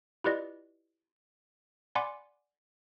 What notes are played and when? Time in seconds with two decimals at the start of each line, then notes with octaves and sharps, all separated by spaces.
0.24 E4 F4 G4 B4 D5 D#5
1.95 D5 F#5 G#5 B5 C6 D6